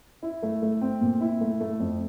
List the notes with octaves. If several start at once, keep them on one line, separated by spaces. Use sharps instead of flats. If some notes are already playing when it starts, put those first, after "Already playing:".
E4
A3
A3
C4
A#2
E4
A3
A3
F2